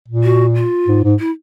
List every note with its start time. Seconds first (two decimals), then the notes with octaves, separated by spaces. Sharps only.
0.08 A#2
0.24 F#4
0.55 F4
0.88 G#2
1.04 G#2
1.19 E4